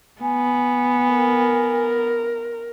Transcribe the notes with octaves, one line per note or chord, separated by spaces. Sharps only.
B3 G#5
A#4